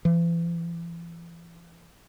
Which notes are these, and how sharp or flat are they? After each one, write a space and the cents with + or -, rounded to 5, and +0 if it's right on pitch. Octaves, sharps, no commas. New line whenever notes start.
E3 +40